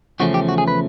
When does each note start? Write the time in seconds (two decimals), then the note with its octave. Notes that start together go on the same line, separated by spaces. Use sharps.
0.20 E2 C#3 F3 A3 C#4 F#4
0.34 G4
0.49 F#4
0.58 G#4
0.68 B4